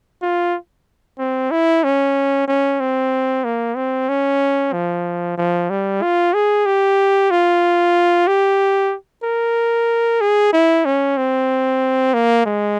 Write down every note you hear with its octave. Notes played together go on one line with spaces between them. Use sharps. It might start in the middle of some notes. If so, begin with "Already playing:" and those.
F4
C4
E4
C#4
C#4
C4
A#3
C4
C#4
F3
F3
G3
F4
G#4
G4
F4
G4
A#4
G#4
E4
C#4
C4
A#3
G#3